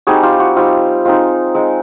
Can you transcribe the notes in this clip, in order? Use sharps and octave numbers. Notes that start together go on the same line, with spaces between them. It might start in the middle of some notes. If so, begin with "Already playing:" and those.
G3 C4 D#4 F#4 G#4
F4 G4
F#4
G3 C4 D#4 F4
G#3 C4 D#4 F4
G#3 C4 D#4